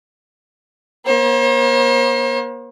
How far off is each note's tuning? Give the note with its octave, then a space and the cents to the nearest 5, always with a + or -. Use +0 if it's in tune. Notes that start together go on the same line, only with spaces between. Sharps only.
A#3 +40 C5 +45